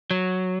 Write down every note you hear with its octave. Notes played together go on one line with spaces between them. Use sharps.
F#3